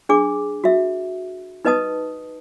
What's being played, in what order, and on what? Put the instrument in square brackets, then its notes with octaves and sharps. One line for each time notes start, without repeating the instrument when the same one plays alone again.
[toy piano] D4 G#4 D6
F#4 E5
D#4 B4 D#5 A5 D#6